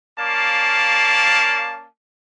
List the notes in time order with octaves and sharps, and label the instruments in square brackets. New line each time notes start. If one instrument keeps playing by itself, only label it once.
[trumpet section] A#3 C#4 D5 F5 A5